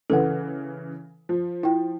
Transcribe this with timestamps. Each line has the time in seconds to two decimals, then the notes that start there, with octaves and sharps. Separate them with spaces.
0.10 C#3 E3 A4 B4 F#5
1.29 F3
1.63 E4 G5